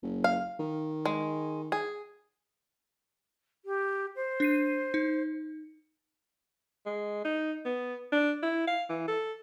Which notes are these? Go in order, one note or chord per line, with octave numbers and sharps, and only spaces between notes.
F#1
F5
D#3
G#3
G#4
G4
C5
D4 C7 D#7
D#4
G#3
D#4
B3
D4
E4
F5
E3
A4